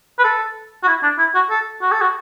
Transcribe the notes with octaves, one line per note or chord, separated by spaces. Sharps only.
B4
A4
F#4
E4
D4
E4
F#4
A4
F#4
A4
F#4